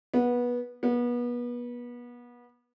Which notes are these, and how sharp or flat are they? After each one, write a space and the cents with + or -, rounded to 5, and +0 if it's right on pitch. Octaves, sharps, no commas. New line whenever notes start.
B3 -20
B3 -30